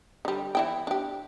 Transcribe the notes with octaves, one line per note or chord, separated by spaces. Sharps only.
D3 G3
E3 E4 G5
D4 G4